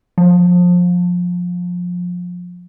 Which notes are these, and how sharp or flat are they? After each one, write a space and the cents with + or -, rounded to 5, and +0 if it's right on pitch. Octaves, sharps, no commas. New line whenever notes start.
F3 +25